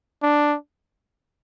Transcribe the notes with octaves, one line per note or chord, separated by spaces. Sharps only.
D4